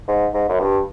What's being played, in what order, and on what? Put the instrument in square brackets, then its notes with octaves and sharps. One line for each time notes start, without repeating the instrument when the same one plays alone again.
[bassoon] G#2
G#2
F#2
G2